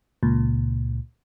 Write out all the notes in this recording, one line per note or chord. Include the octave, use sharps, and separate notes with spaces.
C#2 A#2